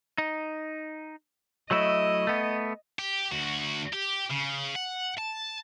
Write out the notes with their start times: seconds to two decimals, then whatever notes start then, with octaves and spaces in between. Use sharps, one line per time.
0.18 D#4
1.71 F#3 A3 E4 D#5
2.27 A3 B3
2.99 G4
3.32 D2 F#4
3.93 G4
4.31 C#3
4.76 F#5
5.18 A5